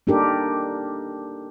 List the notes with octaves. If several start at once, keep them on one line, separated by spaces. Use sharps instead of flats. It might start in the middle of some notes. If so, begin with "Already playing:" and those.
A#3 D4 D#4 G4 A4 A#4